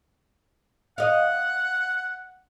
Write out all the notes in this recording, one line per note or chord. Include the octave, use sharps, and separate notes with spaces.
D#5 F5 F#5